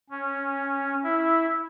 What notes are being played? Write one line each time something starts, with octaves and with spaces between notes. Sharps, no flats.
C#4
E4